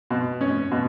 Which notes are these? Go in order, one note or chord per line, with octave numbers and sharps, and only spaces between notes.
B2
C#4
B2